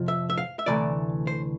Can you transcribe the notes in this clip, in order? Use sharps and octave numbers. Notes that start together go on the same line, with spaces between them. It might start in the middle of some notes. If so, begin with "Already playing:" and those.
Already playing: F2 C3 F3
E5
E5
F5
E5
D2 C3 E3 A3 D5
C5